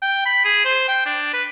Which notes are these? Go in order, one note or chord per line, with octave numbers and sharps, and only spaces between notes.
G5
B5
G#4
C5
G5
D4
B4